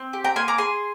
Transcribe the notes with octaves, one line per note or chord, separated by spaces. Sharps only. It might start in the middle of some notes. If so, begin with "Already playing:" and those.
Already playing: C4
G4
G5 A#5
A#3 G#5 C6
A#5 D6
G#4 G#5 C6